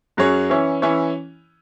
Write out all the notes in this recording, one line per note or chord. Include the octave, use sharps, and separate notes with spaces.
F#2 F#3 C#4 G#4 C#5
E3 C#4 E4 C#5
E3 C#4 E4 C#5